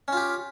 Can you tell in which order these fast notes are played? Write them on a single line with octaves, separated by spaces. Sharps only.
C#4 F4 G4